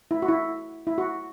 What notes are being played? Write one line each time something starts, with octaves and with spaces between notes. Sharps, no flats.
E4
F#4
E4
E4
F#4